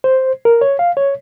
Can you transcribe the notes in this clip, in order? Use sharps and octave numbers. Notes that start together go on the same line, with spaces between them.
C5
A#4
C#5
F5
C#5